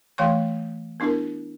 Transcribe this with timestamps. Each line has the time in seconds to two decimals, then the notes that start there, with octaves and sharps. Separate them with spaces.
0.18 E3 A3 F5 G5 C6 C#6
1.00 B3 D4 E4 G4 A#4